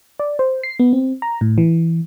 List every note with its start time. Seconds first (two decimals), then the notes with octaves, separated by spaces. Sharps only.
0.19 D5
0.39 C5
0.63 C7
0.79 B3
0.93 C4
1.22 A#5
1.41 A2
1.58 E3